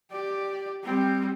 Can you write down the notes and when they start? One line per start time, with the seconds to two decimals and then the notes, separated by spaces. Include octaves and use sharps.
0.11 G4 D5
0.84 G3 C4